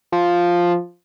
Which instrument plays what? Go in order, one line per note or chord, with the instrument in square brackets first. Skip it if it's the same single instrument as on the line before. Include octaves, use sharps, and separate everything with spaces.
[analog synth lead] F3